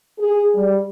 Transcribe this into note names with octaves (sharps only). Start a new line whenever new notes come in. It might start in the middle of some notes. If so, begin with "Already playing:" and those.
G#4
G3